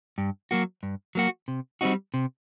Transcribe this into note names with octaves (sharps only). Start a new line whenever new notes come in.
G2
F#3 A#3 F#4
G2
F#3 A#3 F#4
C3
G3 C4 D#4 F#4
C3